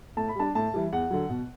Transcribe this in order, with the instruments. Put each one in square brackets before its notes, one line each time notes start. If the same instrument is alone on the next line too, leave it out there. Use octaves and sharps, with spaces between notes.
[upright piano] A2 A5
B5
G3 D4 A5
A2 A5
E3 G3
E2 F#5
D3 F#3
B2